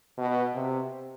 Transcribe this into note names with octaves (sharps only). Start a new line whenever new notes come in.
B2
C3